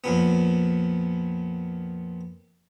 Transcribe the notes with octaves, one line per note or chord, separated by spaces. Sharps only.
F2 A#2 B3